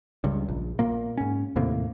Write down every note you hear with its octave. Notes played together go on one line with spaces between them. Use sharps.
C#2 G2
A#1
A#2 A#3
G#2 C#4
D#2 A2 C3 A#3